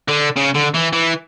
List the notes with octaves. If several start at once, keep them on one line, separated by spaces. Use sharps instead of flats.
D3
C#3
D3
E3
E3